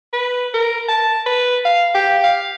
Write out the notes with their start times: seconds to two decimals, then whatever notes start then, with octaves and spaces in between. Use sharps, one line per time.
0.13 B4
0.54 A#4
0.89 A5
1.26 B4
1.65 F5
1.95 G4
2.24 F5